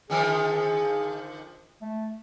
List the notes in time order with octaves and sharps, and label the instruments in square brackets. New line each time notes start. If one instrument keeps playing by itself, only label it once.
[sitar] D3 D#3 F3 [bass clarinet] G#4
[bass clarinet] A3